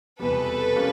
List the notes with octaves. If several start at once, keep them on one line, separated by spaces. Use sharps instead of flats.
F1 E2 B2 G3 A4 B4
G3 A#3 C#4